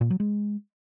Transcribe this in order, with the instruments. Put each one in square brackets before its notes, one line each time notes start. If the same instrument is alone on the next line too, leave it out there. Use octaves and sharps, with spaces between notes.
[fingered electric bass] A#2
F#3
G#3